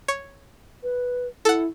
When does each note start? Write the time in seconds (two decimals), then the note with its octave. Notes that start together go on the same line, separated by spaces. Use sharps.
0.08 C#5
0.83 B4
1.45 E4 A4 F#5